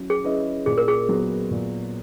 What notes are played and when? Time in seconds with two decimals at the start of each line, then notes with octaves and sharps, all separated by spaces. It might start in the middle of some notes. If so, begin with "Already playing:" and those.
Already playing: F#3 C#4 E4
0.10 G#4
0.24 C#4 E4 B4 D#5
0.66 A#2 G#4
0.78 A#4
0.88 G#4
1.09 F#3 B3
1.51 A#2